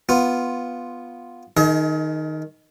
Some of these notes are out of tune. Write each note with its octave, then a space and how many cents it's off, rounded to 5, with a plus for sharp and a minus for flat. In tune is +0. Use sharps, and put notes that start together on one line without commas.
B3 +0 F4 +0
D#3 +0 G#4 +35 D#5 +35